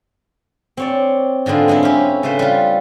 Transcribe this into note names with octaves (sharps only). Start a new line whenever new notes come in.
C4 C#5 D5
G#2 D3 B3 C4 F4
F#3 G#3 C4 E4
C#4 G4
C#3 A3 A4 B4 C5
G3 F4